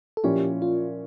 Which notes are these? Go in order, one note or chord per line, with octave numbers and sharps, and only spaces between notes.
A4
A#2 F3 C#4 E4 G4
F4